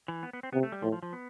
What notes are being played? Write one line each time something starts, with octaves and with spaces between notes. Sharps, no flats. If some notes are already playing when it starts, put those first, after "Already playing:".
E3
B3
B3
C4
C3 B3
A3
G3
A2 F3
F3
F3
B3